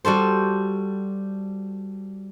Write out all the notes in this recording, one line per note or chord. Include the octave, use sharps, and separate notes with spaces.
G3 F#4 A4 C5